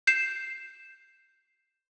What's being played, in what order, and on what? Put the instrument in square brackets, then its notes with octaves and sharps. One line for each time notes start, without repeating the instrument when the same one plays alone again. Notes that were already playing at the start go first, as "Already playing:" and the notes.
[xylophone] G6 C7 E7